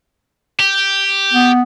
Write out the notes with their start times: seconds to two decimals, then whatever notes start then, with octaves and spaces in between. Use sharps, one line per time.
0.60 G4
1.34 B3